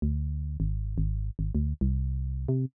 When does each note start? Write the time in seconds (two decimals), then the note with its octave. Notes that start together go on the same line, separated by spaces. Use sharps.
0.02 D2
0.60 G#1
0.98 G#1
1.39 G#1
1.55 D2
1.81 C2
2.48 C3